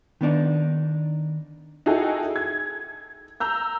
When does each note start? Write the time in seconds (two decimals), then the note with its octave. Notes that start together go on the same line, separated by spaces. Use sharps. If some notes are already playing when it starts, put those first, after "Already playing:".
0.21 D#3 B3 D4 D#4
1.86 D#4 E4 F#4 G#4 A4 G5
2.36 G#6
3.40 A#5 E6 G6